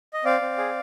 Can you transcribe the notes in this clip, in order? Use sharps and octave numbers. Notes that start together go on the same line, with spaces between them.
D#5
C4 D5 F5
C4
G#4